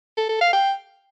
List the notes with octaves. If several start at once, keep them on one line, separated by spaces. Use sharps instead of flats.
A4
A4
F5
G5